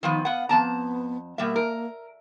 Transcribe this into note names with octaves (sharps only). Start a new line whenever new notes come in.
D#3 F3 B3 D#4
B3 F5 F#5
F2 B3 A5 A#5
B2 G3 A#3 E5
A#4